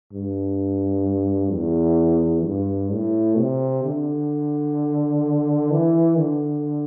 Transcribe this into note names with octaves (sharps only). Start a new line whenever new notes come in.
G2
E2
G2
A2
C3
D3
E3
D3